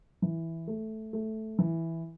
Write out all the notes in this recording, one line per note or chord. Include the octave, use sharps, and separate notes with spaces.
E3
A3
A3
E3